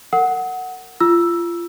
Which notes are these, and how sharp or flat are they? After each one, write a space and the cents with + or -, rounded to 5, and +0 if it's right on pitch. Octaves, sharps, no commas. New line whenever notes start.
A#4 -30 F#5 +0 D#6 +45
F4 -25 E6 +5